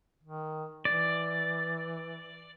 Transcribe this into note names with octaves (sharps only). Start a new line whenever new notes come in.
D#3
E3 D5